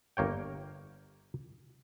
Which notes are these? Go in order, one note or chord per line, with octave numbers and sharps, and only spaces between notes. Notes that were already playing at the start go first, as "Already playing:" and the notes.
G1 A#3 C#5 G5